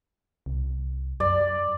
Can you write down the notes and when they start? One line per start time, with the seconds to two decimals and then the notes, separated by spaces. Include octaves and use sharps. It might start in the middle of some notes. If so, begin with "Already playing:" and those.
0.46 C2
1.20 F#2 D5